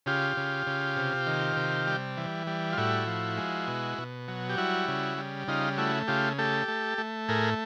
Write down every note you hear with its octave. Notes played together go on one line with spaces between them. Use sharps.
C#3 F4 G4
C#3
C#3
C3
D#3
C3
G3
E3
G3
F4
A2 E4 F#4
F3
G#3
B2
B2
F#3
G4
G3 E4 F#4
C#3
G3
C#3 D#4 F4
A3 E4 F#4
C#3 F4 G4
A3 G4 A4
A3
A3
A2 G#4 A#4